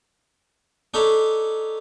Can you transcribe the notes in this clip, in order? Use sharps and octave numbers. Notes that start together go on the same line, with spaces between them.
D4 D#4 A4 C#5 B5